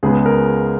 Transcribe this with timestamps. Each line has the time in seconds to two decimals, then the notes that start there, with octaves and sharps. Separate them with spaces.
0.03 C#2 C#3 G#3 B3 G#4
0.26 A#4